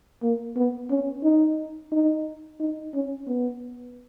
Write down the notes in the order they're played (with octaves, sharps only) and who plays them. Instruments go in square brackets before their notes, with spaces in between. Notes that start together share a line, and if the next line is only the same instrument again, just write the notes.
[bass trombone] A#3
B3
C#4
D#4
D#4
D#4
C#4
B3